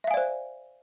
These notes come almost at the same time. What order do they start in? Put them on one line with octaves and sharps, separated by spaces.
E5 F5 G#5 D5 C5